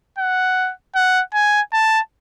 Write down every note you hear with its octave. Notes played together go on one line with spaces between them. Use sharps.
F#5
F#5
G#5
A5